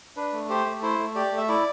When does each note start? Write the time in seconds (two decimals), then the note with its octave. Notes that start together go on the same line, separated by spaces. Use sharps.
0.16 D4 B4
0.33 A3
0.49 G4 C5
0.66 A3
0.82 E4 C5
0.99 A3
1.15 G4 D5
1.32 A3
1.38 E5
1.48 E4 D5